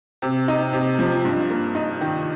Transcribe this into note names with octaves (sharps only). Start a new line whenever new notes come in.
C3
D#4
C3
F3
G2
A#3
D#4
D#3